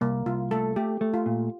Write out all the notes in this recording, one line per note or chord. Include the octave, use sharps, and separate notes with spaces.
C2 A#3
C2 F4
A3 A4
A3 G4
A3
F4
A#2